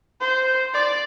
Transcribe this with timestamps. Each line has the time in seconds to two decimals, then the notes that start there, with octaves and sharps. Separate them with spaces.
0.21 C5
0.73 D5